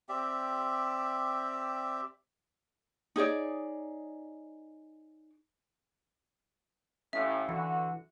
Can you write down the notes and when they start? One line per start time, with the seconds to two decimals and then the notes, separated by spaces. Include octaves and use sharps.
0.09 C4 G4 D5 E5
3.16 D#4 G#4 C#5 D5
7.13 A1 A2 C#4 E5 F5
7.49 D3 E3 F#4 C#7